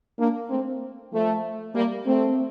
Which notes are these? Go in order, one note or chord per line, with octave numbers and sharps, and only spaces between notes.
A#3 D4
A3 C4
F3 A3
G3 A#3
A3 C4